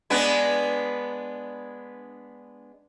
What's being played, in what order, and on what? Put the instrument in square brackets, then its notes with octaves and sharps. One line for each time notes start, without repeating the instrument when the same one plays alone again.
[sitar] G#3 B3 D4